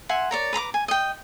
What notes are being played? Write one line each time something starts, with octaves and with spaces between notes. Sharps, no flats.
E5 F#5 G#5 C6
A#4 C#5 D5
B4 A#5 B5 D6
G#5
D#5 G5